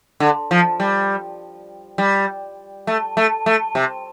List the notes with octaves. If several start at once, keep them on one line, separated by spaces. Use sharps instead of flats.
D3
F3
G3
G3
A3
A3
A3
C3